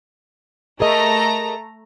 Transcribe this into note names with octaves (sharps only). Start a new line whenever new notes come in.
A3 G#4 A#4 D#5 A#5